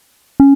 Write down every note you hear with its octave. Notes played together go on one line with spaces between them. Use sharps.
C#4